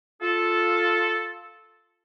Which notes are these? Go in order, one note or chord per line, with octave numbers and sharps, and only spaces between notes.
F4 A4